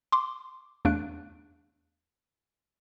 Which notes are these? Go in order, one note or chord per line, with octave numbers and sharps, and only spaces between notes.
C6 D6
E2 A3 D4 F5 F#6 D7